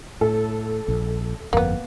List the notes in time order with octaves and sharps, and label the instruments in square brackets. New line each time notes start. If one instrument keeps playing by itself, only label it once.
[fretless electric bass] A2 [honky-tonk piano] A4
[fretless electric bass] A#1
[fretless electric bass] G1 F2 [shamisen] A#3 B3